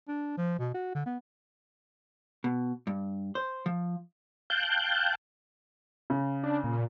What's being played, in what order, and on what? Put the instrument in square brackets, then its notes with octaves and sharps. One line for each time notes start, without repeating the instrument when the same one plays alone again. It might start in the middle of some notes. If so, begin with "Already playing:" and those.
[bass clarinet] D4
F3
B2
F#4
D3
B3
[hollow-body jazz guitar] B2
G2
C5
F3
[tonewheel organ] F5 G5 A5 F#6 G6
[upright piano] C#3
[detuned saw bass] D4
A#2